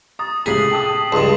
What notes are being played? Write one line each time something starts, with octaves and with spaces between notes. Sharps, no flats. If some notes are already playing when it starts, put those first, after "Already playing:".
A#5 C#6 D#6 A6
C#2 A2 C3 G#4 B6 C7 F#7
G5 A5 D#6
C#2 G2 A5 C6 D#6